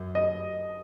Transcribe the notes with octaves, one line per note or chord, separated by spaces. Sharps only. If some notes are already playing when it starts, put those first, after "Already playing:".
Already playing: F#2
D#5